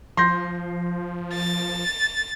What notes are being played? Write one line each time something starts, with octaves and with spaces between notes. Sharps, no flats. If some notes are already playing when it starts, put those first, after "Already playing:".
F3 C6 G6 A#6
A6